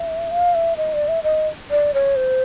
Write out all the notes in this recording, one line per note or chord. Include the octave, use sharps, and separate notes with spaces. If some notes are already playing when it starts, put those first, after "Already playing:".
Already playing: E5
F5
E5
D#5
D5
E5
D#5
D5
C#5
C5